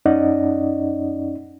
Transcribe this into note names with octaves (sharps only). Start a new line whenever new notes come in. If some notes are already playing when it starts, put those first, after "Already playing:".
F#2 C#4 D#4 D5 D#5 F#5